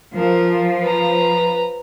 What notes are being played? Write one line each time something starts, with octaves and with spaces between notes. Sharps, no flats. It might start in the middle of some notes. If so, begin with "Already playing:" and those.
F3 A#4
B4 A#5